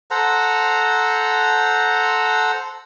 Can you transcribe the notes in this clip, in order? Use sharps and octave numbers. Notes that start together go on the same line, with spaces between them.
A4 C5 F#5 A#5